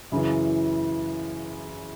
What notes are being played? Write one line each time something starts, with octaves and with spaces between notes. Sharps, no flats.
F#2 C#3 E3